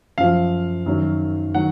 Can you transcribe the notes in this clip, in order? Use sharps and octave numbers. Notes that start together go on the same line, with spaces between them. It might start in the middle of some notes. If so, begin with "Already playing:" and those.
F#2 F3 F5
F#2 D#3 F#3
D#3 F#3 F#5